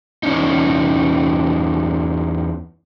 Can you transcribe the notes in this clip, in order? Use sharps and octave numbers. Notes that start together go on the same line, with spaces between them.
E2 C#4 D#4